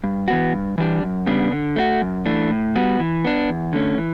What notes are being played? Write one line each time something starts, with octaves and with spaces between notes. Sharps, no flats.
G2
E3 B3 F#4
G2
E3 G3 D4 G4
F#2
C#3 G3 B3 D4
D3
A3 D4 F#4
F#2
E3 A3 D4
A2
G3 B3 F#4
E3
B3 D4
E2
D3 A3 C#4
E3